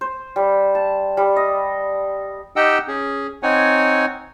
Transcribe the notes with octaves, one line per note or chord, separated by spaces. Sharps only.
C5
G3
A5
G3
D#5
D#4 G4 D#5 F#5 G5 E6
C#4 G#4
C4 D#4 C#5 F#5 G#5